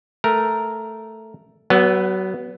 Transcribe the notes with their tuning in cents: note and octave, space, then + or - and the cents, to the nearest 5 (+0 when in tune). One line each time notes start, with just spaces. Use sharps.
A3 +0 A#4 +0
F#3 +30 B3 +0